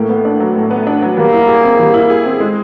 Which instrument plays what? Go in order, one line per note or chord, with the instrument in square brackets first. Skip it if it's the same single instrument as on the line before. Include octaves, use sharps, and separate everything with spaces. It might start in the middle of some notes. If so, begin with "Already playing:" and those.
Already playing: [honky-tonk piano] A2 A#3 [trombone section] A3
[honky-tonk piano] B3
D4
F#3
A2
B3
D4
F#3
[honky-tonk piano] G3 [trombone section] A#3
[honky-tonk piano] E4
G#4
C4
G3
E4
G#4
C4
G#3